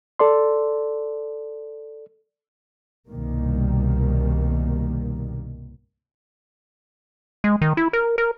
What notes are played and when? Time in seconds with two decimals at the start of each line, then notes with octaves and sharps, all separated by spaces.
0.19 A4 D5 C6
3.09 C2 G2 B2 D#3 G3 A#3
7.44 G#3
7.61 D#3
7.77 E4
7.93 A#4
8.18 A#4